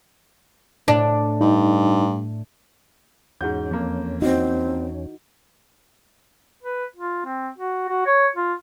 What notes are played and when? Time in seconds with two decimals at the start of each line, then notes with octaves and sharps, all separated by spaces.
0.88 A2 D4
1.41 G2 D#4
3.41 E2 G#2 C#4 F#4 G6
3.71 F2 A#3
4.22 C4 D#4 E4 F#4
6.63 B4
6.96 F4
7.25 C4
7.58 F#4
7.88 F#4
8.06 C#5
8.36 F4